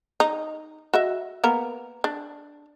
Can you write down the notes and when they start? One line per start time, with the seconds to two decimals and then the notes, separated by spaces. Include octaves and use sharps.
0.20 D#4
0.93 F#4 D#5 E5
1.44 A#3 B3 A#4
2.04 D4